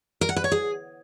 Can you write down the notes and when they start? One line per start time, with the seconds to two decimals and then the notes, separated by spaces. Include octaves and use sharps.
0.21 A#4
0.29 F#5
0.36 B4
0.44 C#5
0.52 G#4